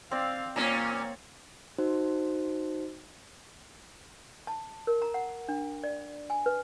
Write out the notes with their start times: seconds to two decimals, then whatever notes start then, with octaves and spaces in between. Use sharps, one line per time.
0.11 C4 D5 F5
0.56 A#2 A#3 C#4 C#5 D5 A#5
1.79 D#4 F#4 C5
4.47 A5
4.87 A#4
5.02 A#5
5.14 F#5
5.49 D4
5.84 D5
6.30 G#5
6.46 B4